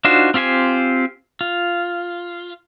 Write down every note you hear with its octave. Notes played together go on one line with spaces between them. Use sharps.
D4 D#4 F4 F#4 C5
C4 F4 G4 C5 G#5
F4